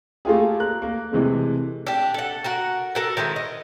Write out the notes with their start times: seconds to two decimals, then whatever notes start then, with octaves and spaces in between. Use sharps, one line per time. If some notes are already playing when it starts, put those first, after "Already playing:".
0.25 A3 A#3 F4 G4 G#4
0.60 A#4 F#6
0.82 A#3
1.12 C3 E3 G#3 A3
1.87 D4 G4
2.14 A4 F#5
2.44 F#4 A#4 F#5
2.95 A4 A#4 F#5
3.17 D#3 G#3 C4 E4
3.36 D#5